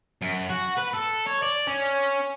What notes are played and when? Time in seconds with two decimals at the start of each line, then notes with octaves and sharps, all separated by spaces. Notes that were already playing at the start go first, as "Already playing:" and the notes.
0.22 F#2
0.50 F#4
0.77 B4
0.93 A4
1.27 C#5
1.42 D5
1.67 C#4